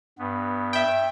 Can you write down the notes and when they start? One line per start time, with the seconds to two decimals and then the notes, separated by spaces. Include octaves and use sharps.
0.19 G2 B3
0.73 E5 G5